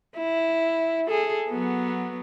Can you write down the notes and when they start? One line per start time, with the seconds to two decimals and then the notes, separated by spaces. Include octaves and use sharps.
0.15 E4
1.07 G#4 A4
1.50 F#3 B3